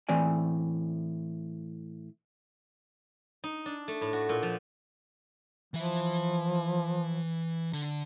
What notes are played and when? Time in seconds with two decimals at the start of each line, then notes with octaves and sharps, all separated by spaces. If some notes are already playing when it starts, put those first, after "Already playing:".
0.09 A2 E3 C4 D5 G#5
3.44 D#4
3.66 D4
3.88 A3
4.01 A2
4.13 F#4
4.29 A#2
4.43 F3
5.74 E3 F3 E5
7.73 D3